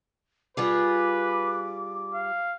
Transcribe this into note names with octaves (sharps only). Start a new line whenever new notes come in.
G3 F4 G#4 B4 D6
F5